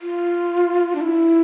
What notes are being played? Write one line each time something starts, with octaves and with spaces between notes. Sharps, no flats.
F4
D4
E4